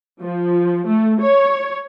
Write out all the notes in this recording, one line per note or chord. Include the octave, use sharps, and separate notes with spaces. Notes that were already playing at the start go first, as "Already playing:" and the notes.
F3
A3
C#5